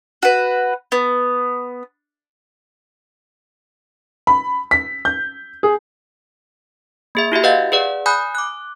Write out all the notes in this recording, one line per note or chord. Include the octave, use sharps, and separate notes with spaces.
F#4 B4
B3
B5
B6
G6
G#4
A#3 G#4 E5
E4 F#4 G4 E5
B4 D#5 F5 F#5 G6 A6
G#4 B4 D5 F#5
G#5 B5 D#6 F#6 G6
D6 F#6